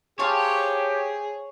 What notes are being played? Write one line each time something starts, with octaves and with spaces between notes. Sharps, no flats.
G4 G#4 C5 C#5 F5 A5